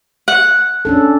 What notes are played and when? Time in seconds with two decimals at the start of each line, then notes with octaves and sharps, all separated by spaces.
0.28 F#5
0.85 C#4 D4 A4